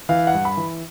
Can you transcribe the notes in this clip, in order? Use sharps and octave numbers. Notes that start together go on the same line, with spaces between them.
E3 F5
F#5
G2
B5
E3